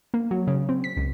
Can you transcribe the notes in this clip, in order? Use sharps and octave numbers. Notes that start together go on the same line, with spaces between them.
A#3
F#3
C#3
C4
B6
C#2